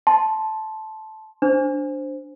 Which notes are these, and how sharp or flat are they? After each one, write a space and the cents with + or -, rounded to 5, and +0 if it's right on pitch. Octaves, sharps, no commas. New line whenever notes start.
A5 -10 C6 +0
D4 -5 C5 +0